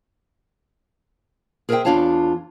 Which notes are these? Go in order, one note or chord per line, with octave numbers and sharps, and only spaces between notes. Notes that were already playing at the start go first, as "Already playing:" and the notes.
G#4 A#4 C5 C#5 E5 G5
E2 D4 F4 C#5 F5 A5